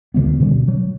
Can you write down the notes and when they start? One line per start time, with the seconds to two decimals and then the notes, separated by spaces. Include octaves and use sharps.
0.14 D2 D3 G#3 B3
0.39 B2 D3 G3 C#4
0.68 F#3